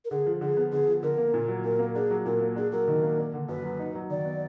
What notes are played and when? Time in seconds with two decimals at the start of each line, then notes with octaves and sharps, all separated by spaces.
0.05 A#4
0.10 D3 G#4
0.26 F3
0.41 D3 G#4
0.57 B3
0.71 D3 G#4
0.87 F3
1.03 D3 A#4
1.18 A#3
1.34 A#2
1.48 F#3
1.64 A#2 A#4
1.79 A#3
1.95 D4 G#4
2.10 F#3
2.25 A#2 A#4
2.41 A#3
2.56 D4 G#4
2.72 F#3 A#4
2.88 D#3
3.03 A#3
3.18 D4
3.33 D3
3.49 F#2 B4
3.64 F#3
3.79 D#4
3.95 F#3
4.10 D#3 D5
4.25 B3